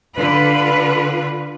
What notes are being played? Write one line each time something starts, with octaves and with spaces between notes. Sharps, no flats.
D3 F4 B4